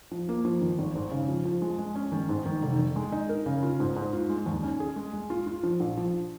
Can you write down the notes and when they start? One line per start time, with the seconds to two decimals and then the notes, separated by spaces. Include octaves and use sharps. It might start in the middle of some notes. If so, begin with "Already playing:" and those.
0.11 F3
0.29 A#3
0.45 F3
0.62 D#3
0.79 G#1
0.95 G#2
1.11 C#3
1.28 F3
1.45 F3
1.62 G#3
1.79 G#3
1.95 C#4
2.12 D#3
2.29 G#2
2.46 D#3
2.62 F1
2.79 D#3
2.96 G#3
3.12 D#4
3.29 A#4
3.46 C#3
3.63 F4
3.80 G#2
3.96 G#2
4.13 F4
4.30 G#3
4.46 D#2
4.63 C#4
4.80 G#4
4.96 G#3
5.13 G#3
5.30 F4
5.47 F4
5.63 F3
5.80 A#1
5.97 F3